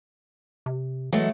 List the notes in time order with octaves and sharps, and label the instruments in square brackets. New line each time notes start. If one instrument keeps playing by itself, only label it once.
[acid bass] C3
[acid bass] E3 [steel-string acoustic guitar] F#3 G#3 A3